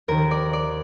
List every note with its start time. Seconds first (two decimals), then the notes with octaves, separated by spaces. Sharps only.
0.08 D#2 D#3 A#4
0.31 D5
0.53 D5